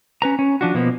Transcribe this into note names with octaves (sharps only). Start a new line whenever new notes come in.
C#4 B4 A#5
C#4
F3 D4 F#4
B2 F3 A#3 B3